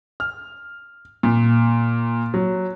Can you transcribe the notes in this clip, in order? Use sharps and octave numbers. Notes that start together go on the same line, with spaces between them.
F6
A#2
F#3